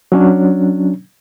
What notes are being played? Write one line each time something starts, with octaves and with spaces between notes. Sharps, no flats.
F#3 C#4 D4